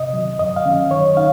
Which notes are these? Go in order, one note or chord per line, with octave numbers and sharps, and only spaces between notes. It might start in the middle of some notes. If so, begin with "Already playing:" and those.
Already playing: C3 D#5
D#3 F#3
F#2 D#5
F5
D#3 F#3 C#4
D#3 C#5
D#4 F5